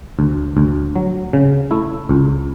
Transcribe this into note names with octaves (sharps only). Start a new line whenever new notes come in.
D2
D2
F#3
C#3
A3 E4
C#2